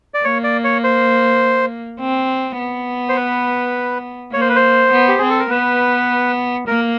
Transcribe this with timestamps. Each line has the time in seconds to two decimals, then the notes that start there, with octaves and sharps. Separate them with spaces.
0.14 D5
0.25 A#3 C#5
0.44 D5
0.64 C#5
0.84 C5
2.00 C4
2.59 B3
3.09 C5
3.16 B4
4.33 A#3 C#5
4.41 C5
4.49 B4
4.56 C5
4.92 B3
5.08 G4
5.19 C4 G#4
5.30 A4
5.39 A#4
5.50 B3 B4
6.67 A#3 A#4